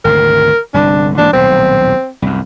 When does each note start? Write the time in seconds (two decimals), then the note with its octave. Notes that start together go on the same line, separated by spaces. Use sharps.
0.05 G#1 D2 C3 A#4
0.74 G1 C2 D3 D4
1.18 G#2 E3 A#3 D4
1.33 D#1 B1 A2 C4
2.22 C2 F#2